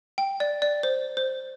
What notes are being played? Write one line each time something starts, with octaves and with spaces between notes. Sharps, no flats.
G5
D5
D5
C5
C5